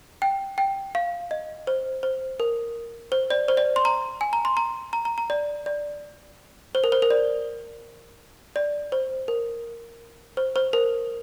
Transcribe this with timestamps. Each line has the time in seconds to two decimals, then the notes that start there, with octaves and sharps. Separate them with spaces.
0.22 G5
0.58 G5
0.95 F5
1.31 D#5
1.67 C5
2.03 C5
2.40 A#4
3.12 C5
3.30 D5
3.48 C5
3.57 D5
3.76 C6
3.85 A#5
4.21 G#5
4.33 A#5
4.45 C6
4.57 A#5
4.93 A#5
5.05 A#5
5.18 A#5
5.30 D5
5.66 D5
6.75 C5
6.84 A#4
6.92 C5
7.02 A#4
7.11 D5
8.56 D5
8.92 C5
9.28 A#4
10.37 C5
10.56 C5
10.73 A#4